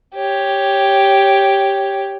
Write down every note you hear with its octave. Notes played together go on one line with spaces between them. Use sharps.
G4 C#5